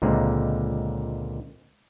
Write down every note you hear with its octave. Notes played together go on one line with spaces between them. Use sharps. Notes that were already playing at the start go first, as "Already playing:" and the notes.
C#2 A#2 D3 G#3 A#3 C4